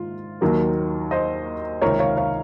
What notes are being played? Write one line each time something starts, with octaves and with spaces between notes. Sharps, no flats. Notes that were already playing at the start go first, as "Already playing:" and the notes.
Already playing: G#2 D#3 F4
D#2 D#3 F#3 A#3
C5 D#5
C#2 C3 D#3 A#4 C#5
C#5 F5
C#5 F5